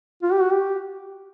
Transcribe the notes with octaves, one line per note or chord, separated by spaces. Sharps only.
F4
G4
F#4
G4